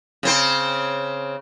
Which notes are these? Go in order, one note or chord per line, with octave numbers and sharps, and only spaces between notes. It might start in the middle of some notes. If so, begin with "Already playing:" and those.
C#3 C4 C5